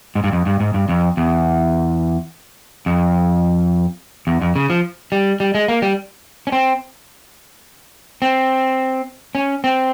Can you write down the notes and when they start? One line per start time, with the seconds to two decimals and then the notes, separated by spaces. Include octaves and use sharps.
0.15 G#2
0.24 G2
0.33 F2
0.46 G2
0.60 G#2
0.74 G2
0.89 F2
1.17 E2
2.86 F2
4.27 E2
4.41 F2
4.56 C#3
4.70 F3
5.12 G3
5.40 G3
5.55 G#3
5.68 A#3
5.82 G3
6.47 C#4
6.52 C4
8.22 C4
9.35 C#4
9.64 C4